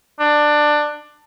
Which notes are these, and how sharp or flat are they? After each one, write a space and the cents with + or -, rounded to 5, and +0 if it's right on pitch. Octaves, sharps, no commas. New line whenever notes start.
D4 +15